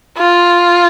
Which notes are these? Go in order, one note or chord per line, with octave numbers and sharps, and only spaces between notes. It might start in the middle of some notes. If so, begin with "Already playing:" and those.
F4